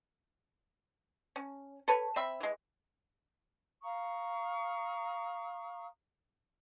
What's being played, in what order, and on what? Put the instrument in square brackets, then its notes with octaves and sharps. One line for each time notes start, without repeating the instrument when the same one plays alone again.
[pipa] C#4
A4 B4 C#5
C4 E5 B5
E3 G#3
[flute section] F5 A#5 C#6 D#6